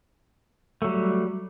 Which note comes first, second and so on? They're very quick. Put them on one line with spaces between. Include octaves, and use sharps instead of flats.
A3 F#3 G3